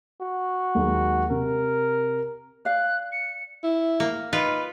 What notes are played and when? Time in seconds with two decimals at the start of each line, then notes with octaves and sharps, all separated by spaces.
0.21 F#4
0.75 D#2 F#3 G#3
1.30 C3 A#4
2.65 D5 F5 F#6
3.12 C#7
3.64 E4
4.00 A#3
4.33 D#4 F4 B4